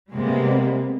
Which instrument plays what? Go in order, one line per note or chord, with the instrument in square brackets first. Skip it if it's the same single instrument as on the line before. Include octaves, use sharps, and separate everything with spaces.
[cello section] C3 G3 G#3 A#3 B3